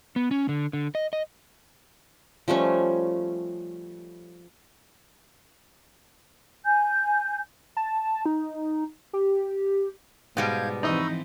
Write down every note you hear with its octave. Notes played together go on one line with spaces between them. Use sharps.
B3
C#4
D3
D3
D#5
D#5
F3 G3 A3 C#4
G#5 G6
A5
D#4
G4
G#2 B2 G3 B3 F5 G6 G#6
E3 F3 C4 D#4 D#5 B5 C#6 E6